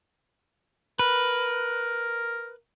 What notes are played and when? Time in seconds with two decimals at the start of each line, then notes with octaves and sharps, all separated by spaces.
0.99 A#4 B4